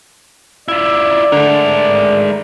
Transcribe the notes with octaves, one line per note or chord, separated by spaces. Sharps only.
E4 F4 D5
D3 G#3 A3 A#4